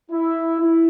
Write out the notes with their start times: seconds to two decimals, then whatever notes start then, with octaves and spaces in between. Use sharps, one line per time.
0.11 E4
0.59 E4